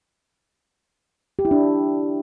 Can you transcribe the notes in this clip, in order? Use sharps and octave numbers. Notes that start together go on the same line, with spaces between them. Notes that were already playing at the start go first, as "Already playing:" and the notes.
G4
E4
D4